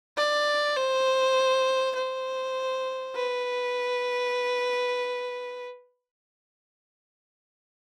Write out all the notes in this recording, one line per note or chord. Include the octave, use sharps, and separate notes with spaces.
D5
C5
C5
B4